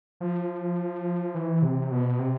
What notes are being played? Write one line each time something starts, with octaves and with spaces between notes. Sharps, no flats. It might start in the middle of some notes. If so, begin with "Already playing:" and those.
F3
E3
C3
B2
C3